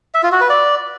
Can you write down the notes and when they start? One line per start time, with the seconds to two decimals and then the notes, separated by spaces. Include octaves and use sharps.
0.14 E5
0.23 F4
0.32 F#4
0.41 B4
0.50 D5